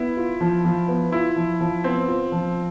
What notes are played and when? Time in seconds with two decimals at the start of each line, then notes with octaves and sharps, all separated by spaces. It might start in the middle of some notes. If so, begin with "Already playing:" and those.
Already playing: B3 E4
0.17 F4
0.41 F3
0.65 F3
0.88 B3
1.12 E4 F4
1.36 F3
1.61 F3
1.84 B3 C4
2.08 F4
2.32 F3